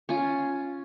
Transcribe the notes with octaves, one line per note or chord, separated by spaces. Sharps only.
C#4 F4